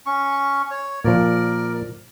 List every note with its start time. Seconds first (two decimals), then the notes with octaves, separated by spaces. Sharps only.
0.06 C#4 C#6
0.71 C#5
1.05 A#2 F3 A#4 D5